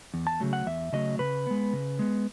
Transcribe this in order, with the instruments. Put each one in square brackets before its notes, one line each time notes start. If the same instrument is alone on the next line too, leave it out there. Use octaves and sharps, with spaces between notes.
[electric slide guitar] E2
A5
C#3 F#3 A3
F#5
E2 E5
C#3 F#3 A3 D#5
C#3 B4
G#3 B3
C#3
G#3 B3